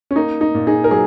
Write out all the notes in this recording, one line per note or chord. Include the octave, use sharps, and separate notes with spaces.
C#4
A#3 D#4
D#4
A#2
D#4 G#4
A#4
F#3 G#4